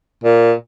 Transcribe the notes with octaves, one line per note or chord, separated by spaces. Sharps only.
A#2